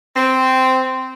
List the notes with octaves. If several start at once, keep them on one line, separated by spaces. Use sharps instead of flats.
C4